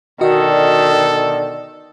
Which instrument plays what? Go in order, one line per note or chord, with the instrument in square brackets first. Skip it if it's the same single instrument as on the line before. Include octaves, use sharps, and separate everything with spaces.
[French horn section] B2 D3 D5 [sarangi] D#3 [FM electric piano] F#4 D#5 [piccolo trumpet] A4